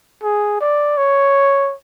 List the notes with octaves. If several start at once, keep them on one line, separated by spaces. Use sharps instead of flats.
G#4
D5
C#5